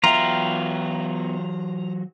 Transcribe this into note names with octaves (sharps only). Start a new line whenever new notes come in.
E3 F#3 B3 F4 E5 G5 A#5